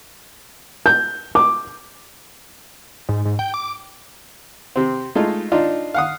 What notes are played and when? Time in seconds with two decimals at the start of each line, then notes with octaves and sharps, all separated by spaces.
0.86 G6
1.35 D6
3.09 G#2
3.25 G#2
3.39 G5
3.54 D6
4.76 C3 C4
5.15 G#3 A3 D#4 F4
5.52 D4 D#4 F4
5.94 F5 F#5 D#6